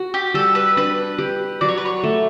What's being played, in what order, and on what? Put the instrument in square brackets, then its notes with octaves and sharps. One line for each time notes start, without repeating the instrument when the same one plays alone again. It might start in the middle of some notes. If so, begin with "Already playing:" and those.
Already playing: [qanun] F#4
[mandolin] G4
[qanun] G3 [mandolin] A4
[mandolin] B4
[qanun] D4 [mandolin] B4
[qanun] G4
[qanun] F#3 [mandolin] D5
[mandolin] C#5
B4
C#5
[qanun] A3